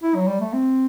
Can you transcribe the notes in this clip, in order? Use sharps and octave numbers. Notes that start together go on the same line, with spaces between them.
E4
F#3
G3
A3
C4